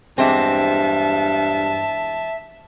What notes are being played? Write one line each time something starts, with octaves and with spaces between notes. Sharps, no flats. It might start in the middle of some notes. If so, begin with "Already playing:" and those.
E2 G2 G#3 C4 E5 A5